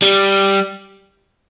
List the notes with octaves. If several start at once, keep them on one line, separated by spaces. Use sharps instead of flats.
G3